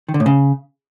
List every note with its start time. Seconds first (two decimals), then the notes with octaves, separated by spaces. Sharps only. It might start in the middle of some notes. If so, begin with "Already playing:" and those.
0.09 D#3
0.14 D3
0.20 A2
0.26 C#3